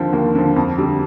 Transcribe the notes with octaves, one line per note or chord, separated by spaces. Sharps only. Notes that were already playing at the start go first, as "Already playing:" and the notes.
Already playing: D#2 D3 F3 C4
D#2 A#3
D3 F3
F2
D3 G3